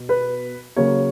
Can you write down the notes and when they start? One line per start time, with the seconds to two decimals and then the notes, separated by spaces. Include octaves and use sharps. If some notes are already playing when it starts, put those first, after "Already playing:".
Already playing: B2
0.09 B4
0.76 C#3 F#3 A#3 C#5